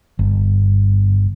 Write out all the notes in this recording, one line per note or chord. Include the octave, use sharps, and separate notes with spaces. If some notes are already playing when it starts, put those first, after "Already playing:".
G1